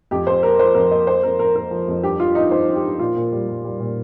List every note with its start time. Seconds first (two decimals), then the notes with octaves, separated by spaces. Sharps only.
0.11 F2 G4
0.27 F2 C5
0.42 A#3 A#4
0.59 F3 C5
0.75 F2 A#4
0.91 A#3 D#5
1.07 A#3 C5
1.23 F2 A#4
1.39 F2 A#4
1.55 A#3 A#4
1.71 F3
1.88 F2
2.03 G2 G4
2.20 F3 F4
2.35 A#3 D#4
2.51 G2 C5
2.68 G2
2.75 G4
2.84 G2
2.99 A#2 F4
3.16 A#2
3.32 G3
3.48 G3
3.64 G3
3.80 A#2